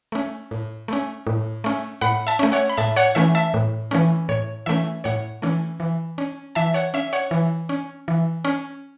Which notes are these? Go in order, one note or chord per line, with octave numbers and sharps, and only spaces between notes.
A3 C#4
A2
A3 C#4
A2
A3 C#4
A2 F#5 B5
E5 A5
A3 C#4
C#5 F#5
B5
A2 E5 A5
C#5 F#5
E3 A3 C#4 E5
E5 A5
A2
E3 A3 C#4
A2 C#5
E3 A3 C#4 E5
A2 C#5 F#5
E3 A3 C#4
E3
C#4
E3 E5 A5
C#5 F#5
C#4 E5
C#5 F#5
E3
C#4
E3
C#4